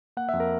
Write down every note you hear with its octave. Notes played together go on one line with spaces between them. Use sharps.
A#3 F#5
F2 E5
A#4